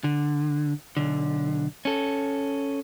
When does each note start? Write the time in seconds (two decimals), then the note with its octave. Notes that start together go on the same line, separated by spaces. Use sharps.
0.04 D3
0.97 B1 D3
1.85 C#4 A4